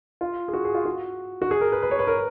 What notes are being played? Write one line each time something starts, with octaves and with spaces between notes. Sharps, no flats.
F4
G#4
F#4
G#4
F4
F#4
F#4
G#4
A#4
B4
B4
C#5
B4
A#4